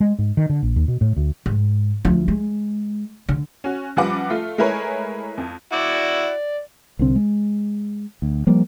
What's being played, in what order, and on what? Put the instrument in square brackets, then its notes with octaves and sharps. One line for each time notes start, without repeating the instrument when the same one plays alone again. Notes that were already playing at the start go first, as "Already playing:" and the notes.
[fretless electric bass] G#3
G#2
D#3
D3
A#1
D#2
B2
A2
D2
[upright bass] G#2
D2 F3
G#3
D3
[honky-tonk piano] C#4 F#4
F#2 F3 G3 B4 F#5 D6
A3 F4
G#3 A3 E4 A#4 B4 C#5
F2
[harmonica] E4 F#4 F#5 [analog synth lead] D5
[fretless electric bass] C2 D3 C4
G#3
D2
F3 G3 A#3